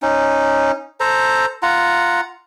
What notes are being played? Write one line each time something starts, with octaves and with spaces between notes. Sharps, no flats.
C#4 D#4
A4 C5 A#5
F4 F#5 A#5